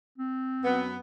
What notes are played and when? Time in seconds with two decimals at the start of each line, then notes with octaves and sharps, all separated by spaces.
0.18 C4
0.63 F#2 B3